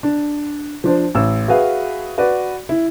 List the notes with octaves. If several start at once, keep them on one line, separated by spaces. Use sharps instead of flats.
D4
F3 D4 C5
A1 E6
F#4 G#4 B4 E5 F5
F#4 B4 D5
E4